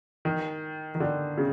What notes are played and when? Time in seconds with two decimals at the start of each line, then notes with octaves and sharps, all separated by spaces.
0.25 D#3
0.95 D#3
1.00 D3
1.38 C#3